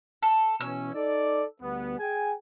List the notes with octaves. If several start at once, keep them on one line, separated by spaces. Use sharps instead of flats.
A4
B2 E3 C#4 E6
D#4 A4 D5
D2 G3 B3
G#4 G5 G#5